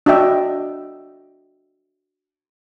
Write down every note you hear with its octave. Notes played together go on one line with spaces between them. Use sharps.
D4 F#4 D#5 E5 G5